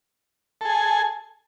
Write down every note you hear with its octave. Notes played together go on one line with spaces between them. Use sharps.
G#4 A4 G#5